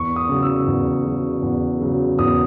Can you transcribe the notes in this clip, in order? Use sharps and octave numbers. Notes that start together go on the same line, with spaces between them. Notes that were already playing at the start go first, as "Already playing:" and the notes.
Already playing: E2 C#6
D#6
C#3 F#3
E6
E2
C#3 F#3
E2
C#3 F#3
E2 D#6